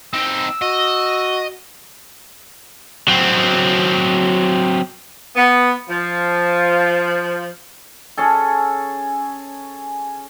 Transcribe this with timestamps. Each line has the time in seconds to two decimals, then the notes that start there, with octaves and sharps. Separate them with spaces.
0.14 C4 D#4 E6
0.62 F#4 D#5
3.08 F#3 C4
5.36 B3
5.89 F3
8.18 C#4 G#4 A4